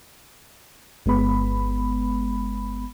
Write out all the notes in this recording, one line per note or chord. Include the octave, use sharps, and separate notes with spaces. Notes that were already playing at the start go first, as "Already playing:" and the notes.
G1 G#3 B3 B5